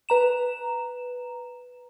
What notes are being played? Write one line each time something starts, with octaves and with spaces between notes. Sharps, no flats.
B4 A#5 E7